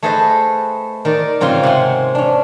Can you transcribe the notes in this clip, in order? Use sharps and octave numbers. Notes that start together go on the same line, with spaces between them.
A3 G#4 A4 B4 C5 D#5
D#3 A#4 D5
G#2 C#3 C4 F4 C6
C3 F#5 G#5
C#4 D4